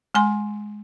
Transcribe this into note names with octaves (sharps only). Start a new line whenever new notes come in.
G#3 G#5 C6